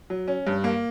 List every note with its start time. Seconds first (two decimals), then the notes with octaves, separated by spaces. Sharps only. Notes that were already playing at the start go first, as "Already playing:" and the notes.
0.10 F#3
0.28 C#4
0.47 G2
0.64 A#3